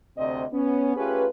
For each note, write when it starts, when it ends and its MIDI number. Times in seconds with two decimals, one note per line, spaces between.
0.18 0.45 38
0.18 0.45 48
0.18 0.45 60
0.18 0.45 74
0.18 0.45 75
0.53 0.93 59
0.53 0.93 61
0.96 1.27 57
0.96 1.27 61
0.96 1.27 65
0.96 1.27 67
0.96 1.27 68
0.96 1.27 71